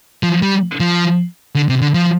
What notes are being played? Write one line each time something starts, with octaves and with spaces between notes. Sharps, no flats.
F3
G3
F3
D3
C3
D3
F3